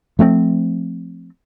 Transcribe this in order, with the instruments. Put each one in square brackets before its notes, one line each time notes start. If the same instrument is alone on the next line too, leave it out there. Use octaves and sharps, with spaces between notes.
[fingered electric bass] F3 A3 A#3 C4